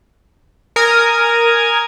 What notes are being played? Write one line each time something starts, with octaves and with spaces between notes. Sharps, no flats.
A#4 G#5 D#6 G#6